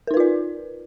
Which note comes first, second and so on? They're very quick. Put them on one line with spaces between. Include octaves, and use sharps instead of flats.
A#4 D#4 B4 F4 D5